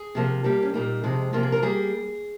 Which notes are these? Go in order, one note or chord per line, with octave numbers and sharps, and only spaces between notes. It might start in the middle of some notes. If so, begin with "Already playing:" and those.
Already playing: G#4
C3 F3 A#3
G2 G3 A#3 G4
C#4
A#2 G3 A#3 D#4
F2 C3 F3 G#3
C3 F3 A#3 F4
G#4
A#4
G3 A#3 G#4